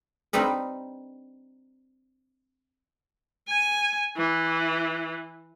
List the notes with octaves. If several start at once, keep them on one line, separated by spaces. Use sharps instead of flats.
G3 C4 D4 D#4 B4
G#5
E3